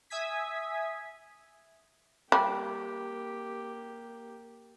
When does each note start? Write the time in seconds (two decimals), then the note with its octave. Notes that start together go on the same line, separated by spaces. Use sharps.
0.10 E5 G#5 D#6 G#6 B6
2.32 G3 A#3 G4